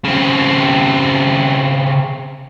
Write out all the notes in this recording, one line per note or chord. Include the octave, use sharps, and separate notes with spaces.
C#3 C4